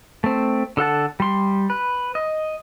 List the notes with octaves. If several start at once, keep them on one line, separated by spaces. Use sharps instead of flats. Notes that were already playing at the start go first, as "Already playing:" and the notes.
A3 C4
D3 A4 F#5 A5
G3 C6
B4
D#5